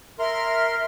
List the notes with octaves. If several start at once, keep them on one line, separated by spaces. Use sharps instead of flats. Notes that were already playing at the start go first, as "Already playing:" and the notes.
A#4 E5 C6 F6